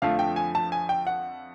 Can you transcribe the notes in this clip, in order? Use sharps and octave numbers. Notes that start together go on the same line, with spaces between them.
F2 D3 F3 A3 F5
G5
G#5
A5
G#5
G5
F#5